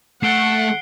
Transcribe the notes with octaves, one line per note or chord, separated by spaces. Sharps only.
A3 F#5 C7 D7 G7